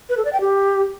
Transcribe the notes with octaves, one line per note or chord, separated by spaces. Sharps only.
B4
A4
D5
G5
G4